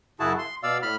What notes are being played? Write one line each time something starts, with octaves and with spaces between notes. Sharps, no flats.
F#2 C#3 E4 F#4 G#4 A5
C6
B2 D5 F5 E6
A2 B5 F6